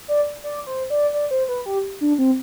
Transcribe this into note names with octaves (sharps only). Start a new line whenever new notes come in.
D5
D5
C5
D5
D5
C5
B4
G4
D4
C4